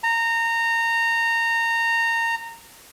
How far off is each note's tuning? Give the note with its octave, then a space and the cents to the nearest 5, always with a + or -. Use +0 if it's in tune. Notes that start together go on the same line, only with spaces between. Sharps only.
A#5 -20